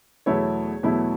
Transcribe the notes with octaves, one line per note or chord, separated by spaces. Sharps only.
E2 B2 F#3 A3 E4 C#5
E2 B2 F#3 A3 E4